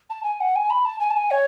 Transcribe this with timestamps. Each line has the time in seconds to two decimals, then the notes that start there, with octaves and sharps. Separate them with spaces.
0.10 A5
0.24 G#5
0.40 F#5
0.55 G#5
0.70 B5
0.85 A5
1.00 G#5
1.10 A5
1.16 G#5
1.30 C#5